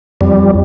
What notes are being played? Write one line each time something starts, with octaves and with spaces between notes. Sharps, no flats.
F2 G3